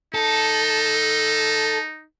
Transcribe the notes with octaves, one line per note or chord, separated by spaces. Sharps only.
D#4 A4